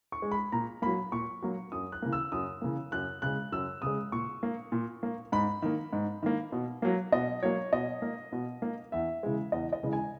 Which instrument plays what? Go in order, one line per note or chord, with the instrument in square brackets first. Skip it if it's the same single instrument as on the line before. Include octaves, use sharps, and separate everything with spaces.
[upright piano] C#6
G#3
B5
A#2 A#5
F#3 A#3 B5
A#2 C#6
F#3 A#3
F#2 D#6
F#6
C#3 E3 A#3
E6
F#2 D#6
C#3 E3 A#3
F#2 F#6
C#3 G#3 F#6
F#2 E6
C#3 G#3 D#6
A#2 C#6
A#3
A#2
A#3
G#2 B5
D#3 A#3
G#2
D#3 A#3
B2
F#3 A#3
B2 D#5
F#3 A#3 C#5
B2 D#5
A#3
B2
A#3
E2 E5
C#3 E3 G#3
E2 D#5
D#5
C#3 E3 G#3
G#5